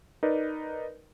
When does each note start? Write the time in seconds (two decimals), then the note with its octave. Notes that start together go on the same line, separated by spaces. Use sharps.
0.23 D#4 A#4 B4 D5